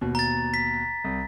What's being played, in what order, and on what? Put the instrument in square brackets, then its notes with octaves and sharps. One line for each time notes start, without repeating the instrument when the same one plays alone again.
[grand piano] D#2 B2
[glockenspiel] A#5 A6
B6
[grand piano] C2